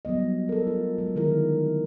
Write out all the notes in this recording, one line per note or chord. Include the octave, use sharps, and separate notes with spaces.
F#3 G3 B3 D#5
A4 A#4
F4
F#3 G#3
D3 D#3 E4 A#4